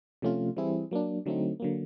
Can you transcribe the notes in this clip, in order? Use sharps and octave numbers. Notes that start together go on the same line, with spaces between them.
C3 F3 A3 C#4 F4
E3 G3 C4 E4 G#4
F#3 A#3 D4
D3 F#3 A3 C4 D#4
D3 F#3 A#3